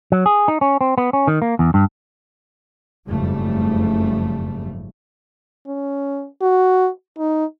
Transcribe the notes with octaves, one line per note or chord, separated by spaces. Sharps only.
F#3
G#4
D#4
C#4
C4
B3
C#4
D#3
A#3
E2
G2
F#1 F2 G#2 C#3 G3 A3
C#4
F#4
D#4